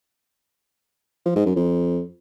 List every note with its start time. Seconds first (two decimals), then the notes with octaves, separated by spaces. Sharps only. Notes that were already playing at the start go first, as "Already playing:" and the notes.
1.26 F3
1.36 G#2
1.46 F#2
1.56 F2